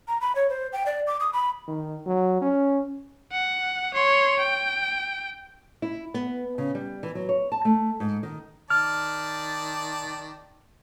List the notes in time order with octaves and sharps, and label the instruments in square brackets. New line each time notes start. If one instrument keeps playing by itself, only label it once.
[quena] A#5
B5
C#5
C5
G5
D5
D6
D#6
B5
[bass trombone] D#3
F#3
C#4
[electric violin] F#5
C#5 C6
G5
[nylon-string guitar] E4
B3
C#3
G3
E3
F#3
C#5
A5
A3
G#2
D#3
[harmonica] D#3 D5 A5 [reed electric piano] F6